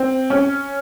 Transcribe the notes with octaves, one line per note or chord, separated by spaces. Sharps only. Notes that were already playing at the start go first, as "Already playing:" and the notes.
Already playing: C4
C#4